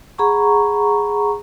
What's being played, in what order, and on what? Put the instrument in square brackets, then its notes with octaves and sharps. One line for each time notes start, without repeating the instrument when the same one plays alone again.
[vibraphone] G#4 F#5 A#5 B5 C#6